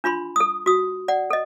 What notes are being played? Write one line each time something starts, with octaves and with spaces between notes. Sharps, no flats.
D4 F4 B5 C6
A4 D#6
F#4 D#6
D5 F#5
A4 D#5